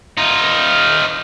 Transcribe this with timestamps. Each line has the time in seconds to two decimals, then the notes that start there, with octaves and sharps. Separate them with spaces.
0.17 D#4 F4